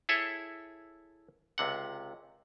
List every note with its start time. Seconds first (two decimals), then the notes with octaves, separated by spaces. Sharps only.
0.09 E4 G#4 A4 C#5 E5
1.58 C#2 C3 F#5